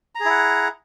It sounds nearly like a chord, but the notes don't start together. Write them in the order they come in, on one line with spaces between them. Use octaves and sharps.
A#5 G#4 E4 F#5